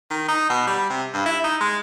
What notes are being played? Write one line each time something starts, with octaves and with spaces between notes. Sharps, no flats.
D#3
D#4
B2
G3
C3
G2
E4
D#4
G#3